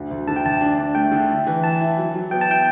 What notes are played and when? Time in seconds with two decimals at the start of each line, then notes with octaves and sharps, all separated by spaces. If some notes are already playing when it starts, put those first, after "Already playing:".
Already playing: D2 D3
0.11 D2
0.28 D3 A5
0.36 G5
0.45 D2 A5
0.61 D4
0.78 D4
0.95 A3 G5
1.12 D3
1.29 E4
1.47 E3
1.63 E4 A5
1.81 E4
1.97 F#3
2.14 F#3
2.31 B3 G5
2.41 A5
2.49 E4 G5